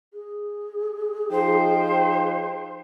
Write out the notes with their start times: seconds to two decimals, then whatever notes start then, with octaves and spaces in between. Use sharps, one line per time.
0.13 G#4
1.31 F3 D#4 C5 G5